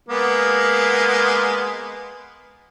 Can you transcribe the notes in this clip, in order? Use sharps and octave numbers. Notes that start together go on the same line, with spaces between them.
G#3 A#3 B3